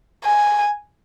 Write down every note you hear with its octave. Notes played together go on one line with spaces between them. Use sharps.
G#5